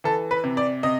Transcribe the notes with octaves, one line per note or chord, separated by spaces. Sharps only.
E3 A4
B4
C3
D5
C3 D#5